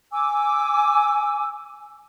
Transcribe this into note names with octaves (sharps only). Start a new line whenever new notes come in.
G#5 D6 E6